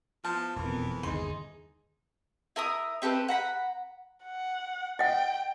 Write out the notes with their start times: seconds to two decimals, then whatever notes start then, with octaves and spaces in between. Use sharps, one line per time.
0.24 F3 B3 E4 A5
0.56 E1 F2 E3 B3 A#4
1.03 G1 D#2 C#3 D#4 G#4 C6
2.56 E4 A#4 A#5 D#6
3.02 C4 G4 A4 B4
3.28 F#5 A#5 B5
4.24 F#5
4.99 D#5 F#5 G5